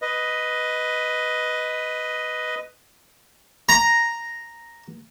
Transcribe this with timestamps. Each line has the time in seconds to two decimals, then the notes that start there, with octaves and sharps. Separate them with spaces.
0.02 B4 D#5
3.69 A#5